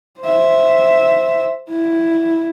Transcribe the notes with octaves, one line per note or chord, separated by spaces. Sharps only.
C5 E5
E4